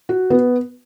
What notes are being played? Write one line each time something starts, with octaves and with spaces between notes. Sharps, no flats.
F#4
B3